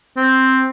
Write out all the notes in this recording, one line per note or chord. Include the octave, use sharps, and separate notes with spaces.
C4